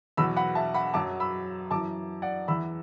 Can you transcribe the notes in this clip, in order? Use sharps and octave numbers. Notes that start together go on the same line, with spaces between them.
E2 B2 F#3 B5 E6
F#5 B5
E5 A5
F#5 B5
F#2 F#3 A5 D6
B5 E6
F#2 E3 A5 D6
D5 F#5
E2 E3 B5 E6